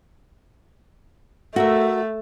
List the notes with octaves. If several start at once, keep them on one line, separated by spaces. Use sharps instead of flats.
A3 F#4 A#4 E5